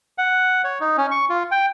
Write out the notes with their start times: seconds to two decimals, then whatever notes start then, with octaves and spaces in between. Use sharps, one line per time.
0.18 F#5
0.64 C#5
0.80 D#4
0.97 C#4
1.11 C#6
1.30 F4
1.51 G5